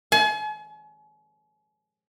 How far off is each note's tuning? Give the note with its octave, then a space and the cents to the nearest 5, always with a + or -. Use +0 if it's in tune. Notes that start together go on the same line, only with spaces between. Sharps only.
G#5 +40